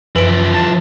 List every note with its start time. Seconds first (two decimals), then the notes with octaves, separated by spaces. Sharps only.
0.16 F#2 E3 F3 B4 D7
0.54 A5